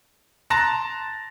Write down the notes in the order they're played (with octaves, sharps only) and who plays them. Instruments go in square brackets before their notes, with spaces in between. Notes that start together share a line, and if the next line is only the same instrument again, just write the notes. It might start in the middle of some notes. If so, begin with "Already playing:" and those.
[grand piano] A5 A#5 C6 F#6 A6 A#6